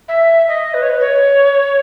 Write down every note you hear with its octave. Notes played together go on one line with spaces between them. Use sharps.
E5
D#5
B4
C#5
B4
C#5